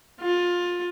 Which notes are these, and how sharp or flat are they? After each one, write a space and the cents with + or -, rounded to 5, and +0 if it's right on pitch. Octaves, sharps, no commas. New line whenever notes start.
F4 +20